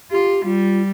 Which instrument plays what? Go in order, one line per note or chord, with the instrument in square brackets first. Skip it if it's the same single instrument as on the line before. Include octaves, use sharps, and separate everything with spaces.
[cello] F4 [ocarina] G4
[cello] G3 [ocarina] F4